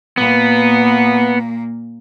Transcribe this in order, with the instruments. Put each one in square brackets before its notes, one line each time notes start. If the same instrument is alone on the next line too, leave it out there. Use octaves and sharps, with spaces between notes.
[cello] A#2 A#3 [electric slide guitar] B3